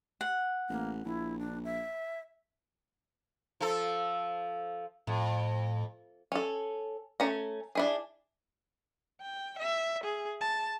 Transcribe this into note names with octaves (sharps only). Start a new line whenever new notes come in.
F#5
A1 A#3
A#1 E4
D4
E5
F3 A4
F2 A2
C#4 A4
A3 C#4 A#5
D4 E4 G#4
G5
E5
G#4
A5